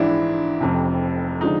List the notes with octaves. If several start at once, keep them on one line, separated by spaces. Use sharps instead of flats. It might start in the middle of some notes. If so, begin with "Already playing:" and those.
Already playing: A#1 G#2 E3 D4 E4
F1 F2 C3
D3 F3 G#3 D#4